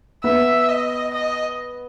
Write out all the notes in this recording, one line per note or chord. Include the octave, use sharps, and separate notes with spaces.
B3 E5
D#5
D#5